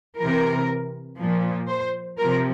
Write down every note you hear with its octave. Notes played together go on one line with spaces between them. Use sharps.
C3 E3 A#4
A#2 F3
C5
C3 F3 A#4